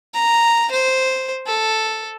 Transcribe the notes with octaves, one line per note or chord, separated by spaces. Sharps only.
A#5
C5
A4